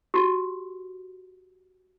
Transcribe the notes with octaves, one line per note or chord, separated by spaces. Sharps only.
F#4 G4